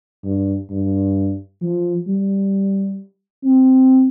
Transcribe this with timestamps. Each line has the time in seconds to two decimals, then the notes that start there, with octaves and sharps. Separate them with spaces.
0.24 G2
0.70 G2
1.62 F3
2.07 G3
3.44 C4